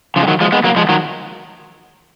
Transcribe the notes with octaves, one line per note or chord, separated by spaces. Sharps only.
C#3 F3
G#3
D#3 F#3
F3 G#3
G#3 B3
F#3 A#3
F3 G#3
D#3 F#3